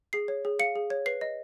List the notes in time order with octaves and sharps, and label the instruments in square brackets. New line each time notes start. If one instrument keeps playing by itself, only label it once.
[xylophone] G#4 C7
C#5
G#4
F5 C#7
G#4
C#5
B4 C7
D#5